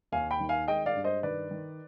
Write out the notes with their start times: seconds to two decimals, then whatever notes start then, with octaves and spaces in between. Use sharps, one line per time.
0.12 D#2 F5 G#5
0.31 G5 B5
0.40 D#3
0.49 F5 G#5
0.68 G#3 D#5 G5
0.86 D5 F5
0.95 G2
1.04 C5 D#5
1.23 D#3 B4 D5
1.51 D#3